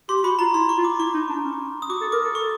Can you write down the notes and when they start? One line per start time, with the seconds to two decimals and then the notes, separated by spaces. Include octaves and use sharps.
0.09 G4 C6
0.24 F#4 B5
0.39 F4 A#5
0.54 E4 C6
0.69 C#6
0.77 F4
0.84 D6
0.99 E4 C#6
1.14 D#4
1.29 D4
1.45 C#4
1.82 D#6
1.89 F#4 D6
2.01 A4
2.12 A#4 D6
2.24 A4
2.35 C#6